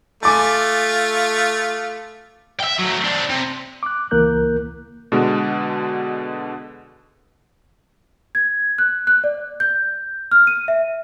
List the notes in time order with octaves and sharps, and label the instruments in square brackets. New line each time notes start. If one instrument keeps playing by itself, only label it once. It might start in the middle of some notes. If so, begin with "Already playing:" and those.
[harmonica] A3 F4 [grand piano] G#5 D6 A6
[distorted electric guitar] E5 G5
F#3 A3
C4 D4
C3
[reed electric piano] D6 F#6
C#2 E3 A#3 A#4 F#6 G6
[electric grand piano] B2 D3 G#3
[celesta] G#6
F#6
F#6
D5
G6
F6
D#7
E5